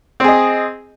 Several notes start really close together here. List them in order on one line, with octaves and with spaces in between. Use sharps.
C4 G#4 D#5